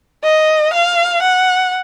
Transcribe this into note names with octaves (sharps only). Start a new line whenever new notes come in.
D#5
F5
F#5